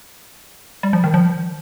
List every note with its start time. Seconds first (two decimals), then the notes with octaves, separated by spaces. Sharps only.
0.83 G3
0.93 F3
1.04 D#3
1.14 F3